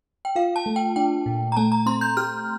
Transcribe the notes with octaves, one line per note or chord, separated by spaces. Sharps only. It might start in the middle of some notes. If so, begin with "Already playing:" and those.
G5
F4 F5
A5
A3
G5
D4 G5
A#2
A#5
A3 A5
A#5
C4 C6
G6
G4 F6